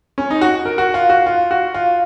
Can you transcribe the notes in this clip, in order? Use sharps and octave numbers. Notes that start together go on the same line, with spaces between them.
C#4
D#4
F#4
A#4
F#4
F4
F#4
F4
F#4
F4